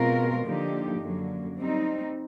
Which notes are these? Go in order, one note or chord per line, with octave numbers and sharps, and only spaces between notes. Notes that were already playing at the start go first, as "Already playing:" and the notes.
Already playing: B2 G#3 C4 F4 A#4
D3 F3 A#3 D#4 G4
F#2 D3 F#3 A#3
G3 C4 D#4